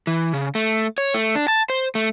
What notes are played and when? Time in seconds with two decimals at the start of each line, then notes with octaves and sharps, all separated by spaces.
0.07 E3
0.33 C#3
0.55 A3
0.98 C#5
1.14 A3
1.35 D4
1.48 A5
1.70 C5
1.95 A3